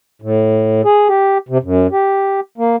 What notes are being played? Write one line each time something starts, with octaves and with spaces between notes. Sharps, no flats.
A2
G#4
G4
C3
F#2
G4
A#3